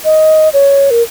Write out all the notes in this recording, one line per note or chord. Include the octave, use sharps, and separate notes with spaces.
D#5
C#5
A#4